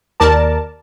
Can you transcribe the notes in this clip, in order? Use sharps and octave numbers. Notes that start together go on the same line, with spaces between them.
D#2 A#4 D5 A5